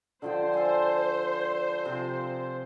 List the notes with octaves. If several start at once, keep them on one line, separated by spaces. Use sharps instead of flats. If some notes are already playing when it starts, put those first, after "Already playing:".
D3 F3 C5 G5
A4 G#5
C3 F3